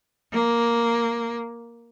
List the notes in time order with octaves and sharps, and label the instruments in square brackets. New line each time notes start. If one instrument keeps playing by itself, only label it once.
[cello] A#3